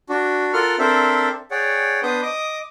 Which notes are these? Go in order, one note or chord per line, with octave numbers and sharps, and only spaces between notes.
D4 F#4
F4 A4 A#4 F#5 F6
C4 D4 A4 A#4 C5 E5
G#4 C#5 D5 F#5 G5
B3 D4 B4 C5 D#6 G6
D#5 D6 D#6